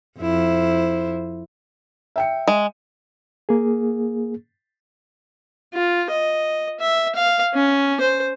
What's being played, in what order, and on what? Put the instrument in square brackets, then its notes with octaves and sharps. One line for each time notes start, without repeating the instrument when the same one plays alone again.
[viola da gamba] F2 E4 C5
[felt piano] E5 G5 C#7
[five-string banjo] G#3
[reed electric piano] A#3 G#4
[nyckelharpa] F4
D#5
E5
F5
C#4
C5